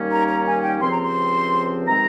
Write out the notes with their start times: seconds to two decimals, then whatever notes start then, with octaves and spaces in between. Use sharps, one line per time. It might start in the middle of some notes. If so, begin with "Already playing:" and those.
Already playing: D#2 D#3 G3 A#3 C#4
0.11 A#5
0.28 A#5
0.46 G#5
0.63 G5
0.81 C#2 C3 F3 C4 C6
0.92 A#5
1.02 C6
1.87 C3 D#3 G#3 C4 A#5